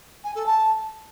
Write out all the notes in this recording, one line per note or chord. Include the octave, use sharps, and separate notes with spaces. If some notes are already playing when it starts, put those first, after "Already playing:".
G#5
A4
A5